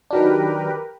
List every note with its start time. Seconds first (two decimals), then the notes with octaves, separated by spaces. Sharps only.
0.11 D#3 F#3 D4 G4 A#4 B4